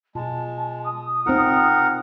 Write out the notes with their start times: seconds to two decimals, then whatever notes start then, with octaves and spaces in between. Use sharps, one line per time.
0.15 B2 G#3 F4 A5
0.84 D#6
1.26 C4 D#4 F4 A#4 F#5